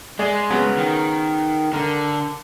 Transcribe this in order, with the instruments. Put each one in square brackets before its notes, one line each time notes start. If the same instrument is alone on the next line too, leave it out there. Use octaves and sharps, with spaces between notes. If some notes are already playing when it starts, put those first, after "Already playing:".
[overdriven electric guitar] G#3 [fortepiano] G#4 D5
[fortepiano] C#3 F#3 B3
[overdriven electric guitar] D#3
[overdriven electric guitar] D3 [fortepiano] A#4